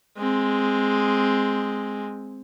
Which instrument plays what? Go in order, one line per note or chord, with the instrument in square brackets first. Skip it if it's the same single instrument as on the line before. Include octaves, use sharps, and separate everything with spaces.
[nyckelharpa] G#3 C4